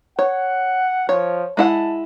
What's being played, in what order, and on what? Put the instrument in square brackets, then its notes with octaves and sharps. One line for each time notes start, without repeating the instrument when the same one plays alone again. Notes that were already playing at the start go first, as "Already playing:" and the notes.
[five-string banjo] C#5 [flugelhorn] F#5
[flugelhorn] F3 [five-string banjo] C#5
[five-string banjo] G#3 E4 F#5 [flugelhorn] A5